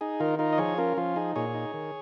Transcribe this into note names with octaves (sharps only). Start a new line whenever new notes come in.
D#4 G#4
D#3 F4 A#4
D#4 F4 A#4
D#5
F3 G#4 C#5
C#4 F4 A#4
F3 F4
D#4 G#4
A#2 G#4 C#5
D#4
D#3